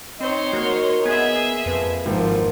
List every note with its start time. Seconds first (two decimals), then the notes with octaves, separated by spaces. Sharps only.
0.21 C4 D#4 C5 C#5 D#5
0.53 A#3 F#4
1.05 B3 G#4 E5 G#6
1.66 F2 B4
2.06 G#1 F3 A#3